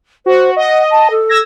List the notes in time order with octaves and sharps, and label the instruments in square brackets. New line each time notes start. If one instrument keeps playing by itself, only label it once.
[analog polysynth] F#4 [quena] C5
[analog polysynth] D#5 [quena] F#5
[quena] A5
A4
[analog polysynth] E6 G#6 A#6